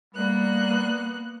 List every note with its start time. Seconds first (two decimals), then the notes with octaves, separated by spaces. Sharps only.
0.15 G3 A#3 B3 F#6